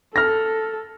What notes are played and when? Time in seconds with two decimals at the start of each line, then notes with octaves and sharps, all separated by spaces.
0.16 A4 F6 A#6